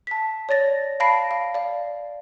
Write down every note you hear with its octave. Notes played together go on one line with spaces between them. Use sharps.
A5 B6
C#5 D5 A6 A#6
F5 A5 B5 A#6 C7 D7
F5
D5 F5